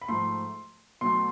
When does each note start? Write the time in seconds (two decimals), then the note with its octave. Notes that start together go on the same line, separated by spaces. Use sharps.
0.01 B5
0.08 G#2 F3 A3 C6
1.01 B2 F#3 A3 C6